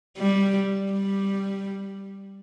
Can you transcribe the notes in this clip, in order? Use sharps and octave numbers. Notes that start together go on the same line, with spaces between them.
G3
G3